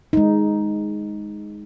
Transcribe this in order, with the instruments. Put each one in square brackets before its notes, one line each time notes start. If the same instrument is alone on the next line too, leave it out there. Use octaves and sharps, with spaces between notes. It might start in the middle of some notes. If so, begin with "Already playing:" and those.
[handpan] G#3 D#4